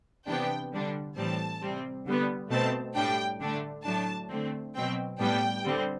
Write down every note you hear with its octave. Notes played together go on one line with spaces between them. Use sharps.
C3 E3 B3 D4 G5
D3 G3 D4
A2 E3 G3 C4 A5
C3 G3 C4
D3 G3 B3
B2 A3 C4 A5
A2 G3 D4 G5
D3 A3 D4
A2 F#3 A3 D4 A5
D3 A3 C4
B2 F#3 C4 G5
A2 G3 B3 D4 G5
D3 G3 C4